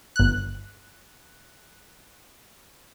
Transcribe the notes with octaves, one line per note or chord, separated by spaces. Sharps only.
G1 F#6